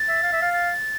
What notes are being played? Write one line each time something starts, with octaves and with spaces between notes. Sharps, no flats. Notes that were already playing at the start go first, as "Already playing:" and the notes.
Already playing: A6
E5
F5
E5
F5
A6